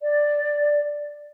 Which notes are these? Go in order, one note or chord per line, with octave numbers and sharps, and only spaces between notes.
D5